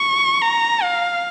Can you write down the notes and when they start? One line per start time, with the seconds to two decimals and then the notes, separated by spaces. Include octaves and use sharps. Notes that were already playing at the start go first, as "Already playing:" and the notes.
Already playing: C#6
0.42 A#5
0.83 F5